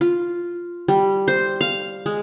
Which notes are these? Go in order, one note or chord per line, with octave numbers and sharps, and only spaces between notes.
F4
G3
C5
F5
G#3